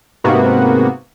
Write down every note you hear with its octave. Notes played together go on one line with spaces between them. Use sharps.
G#2 C3 A#3 B3 F#4